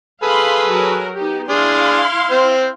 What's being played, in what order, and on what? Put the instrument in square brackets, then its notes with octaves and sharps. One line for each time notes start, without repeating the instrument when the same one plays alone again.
[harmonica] G#4 A4 B4 [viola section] F5 B5 C6
[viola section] F#3 F#4 A#4
B3 D#4 G4
[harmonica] D4 G#4 [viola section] E4 F5 C6
[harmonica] C4 C5